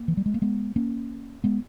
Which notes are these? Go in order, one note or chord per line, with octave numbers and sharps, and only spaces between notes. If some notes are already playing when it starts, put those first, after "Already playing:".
Already playing: A#3
E3
G3
G#3
A#3
G#3 B3
A#3 C#4
G#3 B3